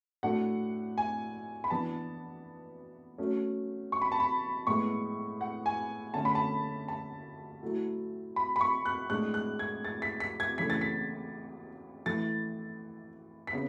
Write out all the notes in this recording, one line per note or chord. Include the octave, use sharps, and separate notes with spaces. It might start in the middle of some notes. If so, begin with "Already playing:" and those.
A2 F#3 A3 D4 F#5
G#5
B5
E3 B3 D4 A5
F#3 A3 C#4
C#6
B5
A5
B5
A2 G#3 B3 C#6
F#5
G#5
D3 A3 C#4 A5
B5
A5
A5
F#3 A3 E4
B5
B5
C#6
F#6
A2 G#3 D4 F#6
F#6
G#6
A6
B6
B6
G#6
C#3 E3 A3 B6
A6
B6
E3 A3 E4 A6
B6
C#3 B3